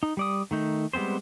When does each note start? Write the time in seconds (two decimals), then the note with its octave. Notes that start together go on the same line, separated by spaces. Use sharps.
0.03 D#4
0.17 G3 D5 D#6
0.51 D#3 A3 D#4
0.93 G3 G#3 B3 C4 C5